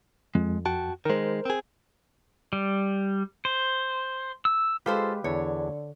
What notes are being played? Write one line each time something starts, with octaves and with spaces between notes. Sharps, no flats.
F2 G#3
F#4 G5 A5
D#3 G#3 A#4 C5
C4 G#4
G3
C5
E6
G#3 F4 G4 A4 B4 C5 F5
E2 D3 D4 E4 C#5